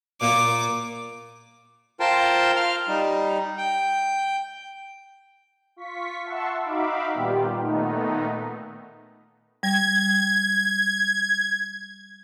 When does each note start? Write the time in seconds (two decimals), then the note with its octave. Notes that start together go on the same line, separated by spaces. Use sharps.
0.21 A#2 A#3 F4 D6
2.00 F4 A#4 C5 G5 A5 C6
2.56 F5 F6
2.88 G3 D#4
3.58 G5
5.76 F4 C#6 B6
6.24 E5 F#5 A5 C6 C#6 E6
6.61 D#4 F#4 E5 F5 B5 D6
7.13 A#2 D#3 G3 B3 F4 G4
7.59 A#2 D#3 A3 B3 D#4
9.63 G3 G#6